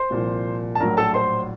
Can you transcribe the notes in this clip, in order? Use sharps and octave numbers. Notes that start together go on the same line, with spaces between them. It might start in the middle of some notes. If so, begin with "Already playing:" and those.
Already playing: C5 C6
C2 A#2 F3
A5
A#1 A2 F#3 A#4 A#5
A4 A5
C5 C6